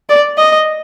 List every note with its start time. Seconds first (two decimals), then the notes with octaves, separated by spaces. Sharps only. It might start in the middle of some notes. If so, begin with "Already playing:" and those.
0.09 D5
0.38 D#5